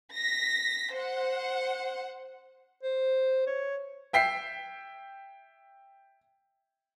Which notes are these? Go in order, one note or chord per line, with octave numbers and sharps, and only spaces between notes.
A#6 B6
C5 F#5
C5
C#5
E5 G5 B6 C7